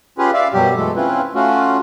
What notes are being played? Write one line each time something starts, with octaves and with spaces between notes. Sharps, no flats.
C#4 F4 G4 G#4 B4
D5 E5 F5
F#2 B2 F#3 G3 G4
E3 G#3 A3 A4
C4 C#4 E4 F4 B4
A3 C#4 F4 F#4